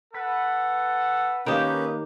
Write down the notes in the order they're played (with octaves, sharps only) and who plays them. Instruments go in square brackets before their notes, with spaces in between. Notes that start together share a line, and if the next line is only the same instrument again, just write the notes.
[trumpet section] A4 F#5 [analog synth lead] B4
[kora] D#3 G4 [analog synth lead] A#3 [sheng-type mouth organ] C#4 D#4 B4